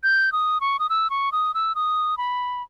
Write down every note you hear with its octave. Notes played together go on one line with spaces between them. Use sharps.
G6
D#6
C#6
D#6
E6
C#6
D#6
E6
D#6
B5